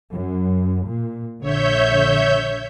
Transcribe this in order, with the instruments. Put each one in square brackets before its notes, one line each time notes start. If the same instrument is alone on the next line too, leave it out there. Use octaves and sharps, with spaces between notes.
[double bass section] F#2
A#2
[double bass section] A#1 D3 [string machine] C#5 E5 G6